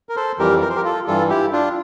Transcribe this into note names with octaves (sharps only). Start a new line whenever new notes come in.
A#4
A4 C5
F2 E3 G3 G4 A#4
A#4
C5
G4 A#4
F4 A4
G2 E3 G3 F4 A4
E4 G4
D4 F4